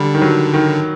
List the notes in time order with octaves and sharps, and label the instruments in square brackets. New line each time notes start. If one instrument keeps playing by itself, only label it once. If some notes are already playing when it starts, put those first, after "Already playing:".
Already playing: [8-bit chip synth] D3 [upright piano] G3
[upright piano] D#3
F#3
D#3